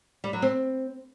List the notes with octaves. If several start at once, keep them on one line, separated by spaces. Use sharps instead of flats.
G3
F#3
C4